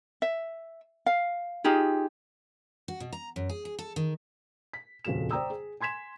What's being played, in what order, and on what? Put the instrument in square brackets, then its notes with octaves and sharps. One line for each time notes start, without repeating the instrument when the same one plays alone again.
[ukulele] E5
F5
D#4 F4 G4 G#4
[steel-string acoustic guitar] F#4
B2
A#5
F#2
G#4
G#4
A4
D#3
[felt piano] B6
D#1 F2 C#3 F#4 A4 E7
C5 D5 G5 A#5 D#6 E6
G#4
G#5 C6 G#6 B6 E7